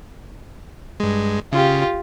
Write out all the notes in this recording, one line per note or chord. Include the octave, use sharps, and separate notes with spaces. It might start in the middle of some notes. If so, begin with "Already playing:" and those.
G2 G#3
C#3 F4 G4